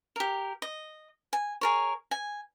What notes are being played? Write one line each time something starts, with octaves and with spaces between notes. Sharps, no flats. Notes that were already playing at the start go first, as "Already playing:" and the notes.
G4 A#4
D#5
G#5
G#4 A#4 C#5
G#5